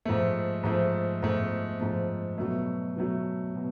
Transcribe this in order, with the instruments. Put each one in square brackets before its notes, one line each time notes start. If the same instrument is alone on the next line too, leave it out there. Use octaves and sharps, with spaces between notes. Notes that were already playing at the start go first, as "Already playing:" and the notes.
[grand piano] G#2 F3 A3
G#2 F3 A3
G#2 F3 A3
G#2 F3 A3
B2 F#3 A3
B2 F#3 A3
B2